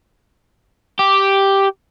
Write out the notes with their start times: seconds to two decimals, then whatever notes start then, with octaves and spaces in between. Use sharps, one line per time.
0.99 G4